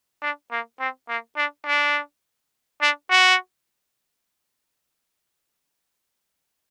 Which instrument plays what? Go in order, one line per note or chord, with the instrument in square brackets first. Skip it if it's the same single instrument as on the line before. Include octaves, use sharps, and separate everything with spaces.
[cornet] D4
A#3
C4
A#3
D4
D4
D4
F#4